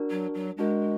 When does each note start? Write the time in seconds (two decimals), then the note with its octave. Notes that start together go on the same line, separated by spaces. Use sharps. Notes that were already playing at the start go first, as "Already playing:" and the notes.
Already playing: D4 F#4 A#4
0.11 F#3
0.35 F#3
0.58 G#3 D4 F#4 A#4